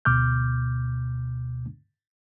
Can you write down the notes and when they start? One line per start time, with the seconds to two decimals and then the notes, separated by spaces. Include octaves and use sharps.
0.05 D2 B2 D6 F6 G6